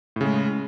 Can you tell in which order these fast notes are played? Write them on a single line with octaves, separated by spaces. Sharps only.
A2 C#3 G#3